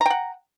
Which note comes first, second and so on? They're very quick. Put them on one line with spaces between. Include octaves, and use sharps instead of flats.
A#5 G5 F#5